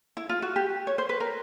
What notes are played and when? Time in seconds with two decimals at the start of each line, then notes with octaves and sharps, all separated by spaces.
0.17 E4
0.29 F4
0.42 F#4
0.56 G4
0.87 C#5
0.98 C5
1.09 B4
1.20 A#4